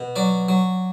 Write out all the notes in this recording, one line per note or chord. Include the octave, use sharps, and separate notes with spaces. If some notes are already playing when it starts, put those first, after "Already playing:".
Already playing: B2
F#3 D5
F#3